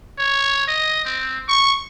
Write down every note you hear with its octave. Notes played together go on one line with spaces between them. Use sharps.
C#5
D#5
C4
C#6